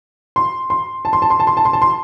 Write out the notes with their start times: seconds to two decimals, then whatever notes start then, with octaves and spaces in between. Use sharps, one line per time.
0.36 C6
0.70 C6
1.05 A5
1.13 C6
1.22 A5
1.30 C6
1.40 A5
1.47 C6
1.57 A5
1.65 C6
1.73 A5
1.82 C6